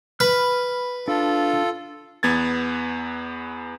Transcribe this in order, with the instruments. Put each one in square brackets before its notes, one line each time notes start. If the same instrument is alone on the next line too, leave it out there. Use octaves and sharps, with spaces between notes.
[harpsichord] B4 [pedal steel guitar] B5 F6
[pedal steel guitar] D4 [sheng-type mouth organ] F4 A4
[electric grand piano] E2 B3 G#6 A6